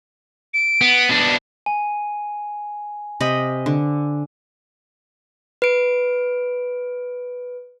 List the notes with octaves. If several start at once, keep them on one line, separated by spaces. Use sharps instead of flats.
D7
B3
B2 D4
G#5
C3 D#5 B5
D3
B4 D7